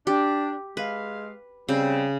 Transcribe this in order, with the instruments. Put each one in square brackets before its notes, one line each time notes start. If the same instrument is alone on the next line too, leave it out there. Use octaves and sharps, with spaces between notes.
[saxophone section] D4 [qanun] G4
[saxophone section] G#3 F5 [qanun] B4
[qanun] C#3 [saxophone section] G3 C4